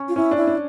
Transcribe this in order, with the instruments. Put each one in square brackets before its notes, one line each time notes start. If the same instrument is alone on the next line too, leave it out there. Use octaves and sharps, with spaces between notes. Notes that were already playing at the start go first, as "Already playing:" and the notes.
Already playing: [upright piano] C#4
[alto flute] F4
[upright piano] C#4 [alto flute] E4
[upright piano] D4
[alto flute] E4
[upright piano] D4